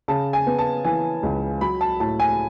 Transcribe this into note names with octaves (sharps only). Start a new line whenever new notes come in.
C#3 A5
G#5
B3
A5
E3 G#5
C#2
F#3 B5
A5
A2 A5
G#5